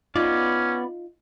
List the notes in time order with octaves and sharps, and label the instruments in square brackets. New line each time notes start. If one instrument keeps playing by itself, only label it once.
[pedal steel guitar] B3 D5 [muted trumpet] C#4 [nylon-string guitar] D#4 F4